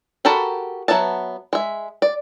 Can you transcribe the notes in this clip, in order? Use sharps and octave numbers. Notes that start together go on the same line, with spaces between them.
F#4 G4 A4 A#4 B5
F#3 B3 E5 A5
G#3 E5
D5